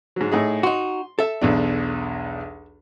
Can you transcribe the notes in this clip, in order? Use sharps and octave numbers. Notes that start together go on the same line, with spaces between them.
G#2 F#3
A2 D#4 G#4
D#4 F#4 C6
A4 E5
B1 E2 D4